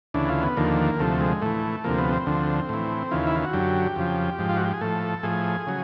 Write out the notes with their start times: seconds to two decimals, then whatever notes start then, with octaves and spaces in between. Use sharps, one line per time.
0.14 D2 C#3 E3 D4
0.29 F4
0.43 B3
0.57 D#2 D3 F3 A#3
0.99 D2 C3 F3 A3
1.21 G#3
1.41 A2 E3 A3
1.84 D2 C3 F3 A#3
1.99 B3
2.13 C4
2.26 D2 D3 F3
2.69 A2 E3
3.11 D#2 C#3 E3 F4
3.27 E4
3.35 F4
3.45 F#4
3.53 F#2 D3 F#3 G4
3.96 F2 C#3 F3
4.39 G#2 F3
4.49 F4
4.57 F#4
4.65 G4
4.73 G#4
4.81 A2 F3 A4
5.23 A2 F3 G#4
5.67 C#3 F#3